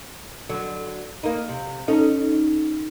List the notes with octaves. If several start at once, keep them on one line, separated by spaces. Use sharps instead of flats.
D3 F#3
A#3 D#4
C3
C#4 D#4 A4